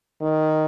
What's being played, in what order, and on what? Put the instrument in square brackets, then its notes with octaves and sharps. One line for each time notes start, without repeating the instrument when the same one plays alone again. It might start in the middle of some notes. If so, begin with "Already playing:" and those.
[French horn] D#3